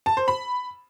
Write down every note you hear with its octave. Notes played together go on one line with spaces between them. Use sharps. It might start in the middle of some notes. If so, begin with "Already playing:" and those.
A5
C5
B5